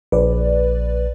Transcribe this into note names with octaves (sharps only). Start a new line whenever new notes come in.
A#1 B4 D5